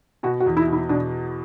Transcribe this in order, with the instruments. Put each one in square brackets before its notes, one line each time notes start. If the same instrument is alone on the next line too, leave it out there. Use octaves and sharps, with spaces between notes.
[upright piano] B2 [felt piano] F#4
[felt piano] F#4
[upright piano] E2
[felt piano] E4
[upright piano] B2
[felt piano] E4
[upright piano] B2 [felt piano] D4